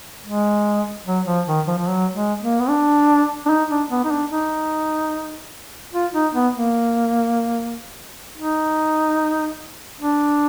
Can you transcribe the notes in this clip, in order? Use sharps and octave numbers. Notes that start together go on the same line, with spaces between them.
G#3
F#3
F3
D#3
F3
F3
F#3
G#3
A#3
B3
D4
D4
D#4
D4
B3
D#4
D4
D#4
F4
D#4
B3
A#3
D#4
D4